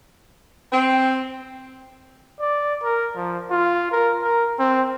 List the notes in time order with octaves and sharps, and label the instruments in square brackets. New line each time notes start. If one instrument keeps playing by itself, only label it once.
[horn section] C4
[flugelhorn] D5
A#4
F3
F4
A#4
A#4
C4